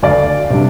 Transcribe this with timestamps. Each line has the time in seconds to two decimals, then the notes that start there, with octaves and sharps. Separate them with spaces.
0.03 D2 D5 F5
0.50 C3 G3 D4